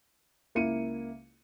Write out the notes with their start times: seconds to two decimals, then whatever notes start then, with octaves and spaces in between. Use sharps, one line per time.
0.55 C#2 A#3 E4 C#7 D#7